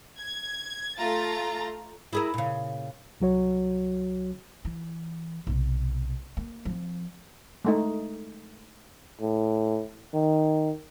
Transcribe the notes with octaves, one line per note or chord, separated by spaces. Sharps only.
G#6
A3 F4 A#5 A6
E4 G#4 A#4
A#2 C#3
C2 F#3 F#4 C#5
E3
B1 C3
A#3
F3 C4
G#3 A3 D#4
A2
D#3